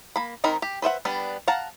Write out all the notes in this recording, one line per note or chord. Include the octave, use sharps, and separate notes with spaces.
A#3 B5
D#3 C4 D#4 A#4 B5
G4
B4 C5 E5 F#5
G3 B3 D4 B4
F5 F#5 A5 A#5